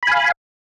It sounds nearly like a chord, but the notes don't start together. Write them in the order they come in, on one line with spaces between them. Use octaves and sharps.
B5 G#5 F5